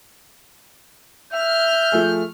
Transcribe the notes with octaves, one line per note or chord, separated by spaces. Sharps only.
E5 F6 G6
F3 A3 G#4